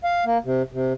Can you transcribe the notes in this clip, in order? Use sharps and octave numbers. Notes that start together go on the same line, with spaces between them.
F5
A#3
C3
C3